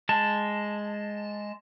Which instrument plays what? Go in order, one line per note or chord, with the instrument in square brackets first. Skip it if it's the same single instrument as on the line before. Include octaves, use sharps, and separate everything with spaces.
[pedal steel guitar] G#3 A5